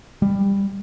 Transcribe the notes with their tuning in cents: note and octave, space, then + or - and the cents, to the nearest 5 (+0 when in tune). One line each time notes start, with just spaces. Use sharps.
G3 +15